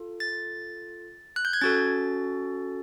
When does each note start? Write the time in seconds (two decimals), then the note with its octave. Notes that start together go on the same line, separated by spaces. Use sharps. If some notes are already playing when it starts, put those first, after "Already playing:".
Already playing: F4 A4
0.20 A6
1.36 F#6
1.45 G6
1.53 G#6
1.61 C#4 F#4 A4 A6